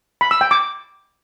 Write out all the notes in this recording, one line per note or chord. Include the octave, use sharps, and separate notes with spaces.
B5
E6
G5
D6